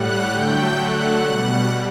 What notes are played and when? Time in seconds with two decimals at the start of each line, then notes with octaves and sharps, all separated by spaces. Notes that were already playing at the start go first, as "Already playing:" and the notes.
Already playing: A2 G3 F#5 F#6
0.31 D3 F#3 A3 G5 G6
0.76 F#5 F#6
1.21 B2 G3